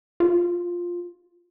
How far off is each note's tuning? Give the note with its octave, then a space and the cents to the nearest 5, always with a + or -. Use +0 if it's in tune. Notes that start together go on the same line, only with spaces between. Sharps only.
F4 +5